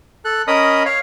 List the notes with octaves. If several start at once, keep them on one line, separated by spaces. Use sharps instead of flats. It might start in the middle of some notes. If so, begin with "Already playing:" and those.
A4 F#6
C#4 A#4 D#5 B5 D#6
C#5 F5